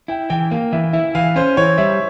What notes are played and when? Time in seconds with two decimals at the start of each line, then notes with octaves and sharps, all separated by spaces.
0.08 E4 G5
0.30 E3 G5
0.51 A#3 F5
0.73 E3 E5
0.93 E4 E5
1.15 E3 F5
1.36 C#4 C5
1.57 E3 C#5
1.78 G3 E5